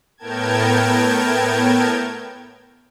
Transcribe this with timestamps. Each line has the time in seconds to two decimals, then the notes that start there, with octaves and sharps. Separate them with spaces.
0.17 A2 B3 A#4 G5 A5 G#6